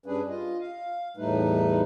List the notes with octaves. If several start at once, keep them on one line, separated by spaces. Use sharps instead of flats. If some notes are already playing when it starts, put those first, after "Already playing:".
G2 G3 C#4 D4 G#4 B4
F4 D#5
F5
E2 A2 G3 A3 D#4 B4